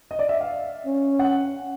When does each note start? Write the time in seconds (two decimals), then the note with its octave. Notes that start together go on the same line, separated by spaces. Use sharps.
0.11 D#5
0.19 D5
0.29 E5
0.41 F5
0.86 C#4
1.19 F#5